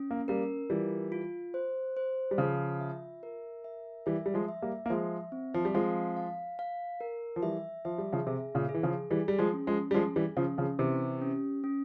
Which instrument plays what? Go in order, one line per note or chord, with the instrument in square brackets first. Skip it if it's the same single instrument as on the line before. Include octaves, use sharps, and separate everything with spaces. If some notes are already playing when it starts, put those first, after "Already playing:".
Already playing: [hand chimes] C#4
[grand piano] A#3
[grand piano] G3 A#3 [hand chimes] A#4
[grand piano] E3 G3 [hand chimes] F4
[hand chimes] F4
C5
C5
[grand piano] G3
[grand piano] C#3 F3 [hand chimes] F4
[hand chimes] E5
A#4
E5
[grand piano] E3 G3 [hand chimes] E5
[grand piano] G3
F3 G#3
[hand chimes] E5
[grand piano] G3 A#3
A#3
[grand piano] F3 G#3 [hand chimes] E5
[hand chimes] C4
[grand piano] F3
G3
[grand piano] F3 G#3 [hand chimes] F5
[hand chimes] F5
F5
A#4
[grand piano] F3
[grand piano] E3 G3 [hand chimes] E5
[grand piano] F3 [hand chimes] E5
[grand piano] G3
C#3 F3
[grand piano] C3 [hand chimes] G#4
[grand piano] A#2 C#3
[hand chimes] G#4
[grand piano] E3
C#3 F3
[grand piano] E3 G3 [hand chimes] G#4
[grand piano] G3
F3 G#3
[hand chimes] C#4
[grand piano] F3 G#3
G3
[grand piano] F3 G#3 [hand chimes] G#4
[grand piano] E3 G3
[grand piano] C#3 F3 [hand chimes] C#4
[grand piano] C#3 F3
[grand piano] C3 E3 [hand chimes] G4
[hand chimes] C#4
C#4